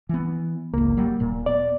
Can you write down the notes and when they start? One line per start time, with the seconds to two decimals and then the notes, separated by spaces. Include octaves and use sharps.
0.09 E3 B3
0.74 G1 C#2 A#3
0.97 F#3 G3
1.20 D#1 A#2
1.46 B3 D5